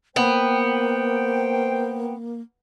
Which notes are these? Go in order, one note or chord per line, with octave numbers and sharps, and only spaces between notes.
A#3 B3 C5 G5